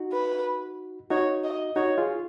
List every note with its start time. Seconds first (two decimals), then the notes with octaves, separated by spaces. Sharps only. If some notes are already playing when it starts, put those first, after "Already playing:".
Already playing: D#4 F#4
0.13 B4
1.11 D#4 F#4 C#5
1.44 D#5
1.76 D#4 F#4 C#5
1.98 F4 G#4